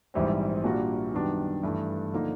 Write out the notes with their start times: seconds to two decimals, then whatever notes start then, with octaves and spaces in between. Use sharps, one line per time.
0.14 A#1 G#2 E3 G3 C4
0.64 A#2 G3 A#3 D4 F#4
1.14 F#2 D#3 G3 B3 D4
1.63 G2 E3 A3
2.13 D3 F3 A#3 D#4